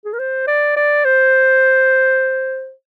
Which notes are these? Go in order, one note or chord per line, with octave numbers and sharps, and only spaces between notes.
G#4
A#4
C5
D5
D5
C5